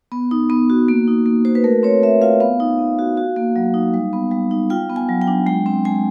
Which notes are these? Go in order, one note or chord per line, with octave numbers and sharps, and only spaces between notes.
B3
D#4
B3
F#4
A#3
D#4
A#3
F#4 C5
B4
A3 A#4
C4 C#5
A3 E5
F4 F5
B3 F5
D#4
B3
F#4
F#4
A#3
F#3
D#4
G3
B3
G3
D#4
F4 G5
B3
G#5
F#3
G5
D4
G#3 G5
C4
G#3 G#5